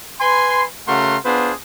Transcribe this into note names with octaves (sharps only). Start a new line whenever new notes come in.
B4 G#5 B5 C6
C#3 A3 F#4 A#4 F#5 C6
B3 D4 F4 G#4 B4 C5